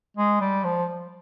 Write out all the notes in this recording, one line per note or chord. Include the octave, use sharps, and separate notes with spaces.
G#3
G3
F3